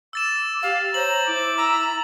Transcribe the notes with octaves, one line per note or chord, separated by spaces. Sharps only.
D6 E6 A6 E7
G4 F5
C5 C#5 A#5 F#7
E4 D6
A#5 E6